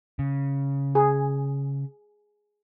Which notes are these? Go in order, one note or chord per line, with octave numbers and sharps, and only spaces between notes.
C#3
G#4